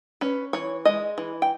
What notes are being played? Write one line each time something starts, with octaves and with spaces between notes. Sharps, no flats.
C#4 B4
E3 C#5
G#3 D#5
E3
G5